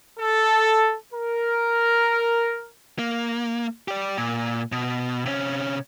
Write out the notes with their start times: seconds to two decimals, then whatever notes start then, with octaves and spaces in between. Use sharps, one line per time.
0.19 A4
1.12 A#4
2.99 A#3
3.88 G4 D5
4.18 A#2
4.72 B2
5.25 C3 C#4